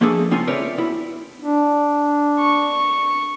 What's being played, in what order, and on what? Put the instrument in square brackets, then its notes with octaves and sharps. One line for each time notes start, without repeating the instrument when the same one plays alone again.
[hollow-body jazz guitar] F3 A3 A#3 D4 G#4 A4
C#2 C4 C#4 F4 A4 G#5
C4 A#4 B4 C#5 D5 E5
B2 E4
[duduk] D4
[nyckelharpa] C#6